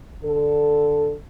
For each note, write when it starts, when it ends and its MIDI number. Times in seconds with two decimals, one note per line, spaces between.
0.24 1.14 50
0.24 1.14 69